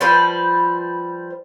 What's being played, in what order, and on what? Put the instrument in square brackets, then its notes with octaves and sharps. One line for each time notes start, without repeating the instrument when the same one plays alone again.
[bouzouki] F3 G3 B4 C5